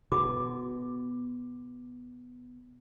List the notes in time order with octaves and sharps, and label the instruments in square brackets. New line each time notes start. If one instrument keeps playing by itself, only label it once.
[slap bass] B2 [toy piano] F#4 D6